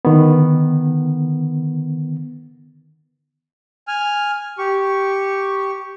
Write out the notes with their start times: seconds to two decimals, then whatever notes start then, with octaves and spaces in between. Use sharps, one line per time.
0.05 D3 D#3 B3
3.88 G#5 F6
4.58 G4 C#6